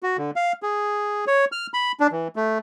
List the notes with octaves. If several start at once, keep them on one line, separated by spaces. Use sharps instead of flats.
F#4
D3
F5
G#4
C#5
F6
B5
D4
E3
A3